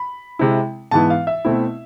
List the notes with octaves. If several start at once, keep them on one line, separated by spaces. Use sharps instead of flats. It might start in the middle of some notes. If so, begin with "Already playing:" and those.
Already playing: B5
C3 G#3 C4 E4
G#2 E3 B3 E4 A5
F5
E5
B2 A3 C4 E4